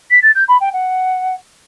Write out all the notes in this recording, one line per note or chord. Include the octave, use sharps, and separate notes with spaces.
B6
A6
G6
B5
G5
F#5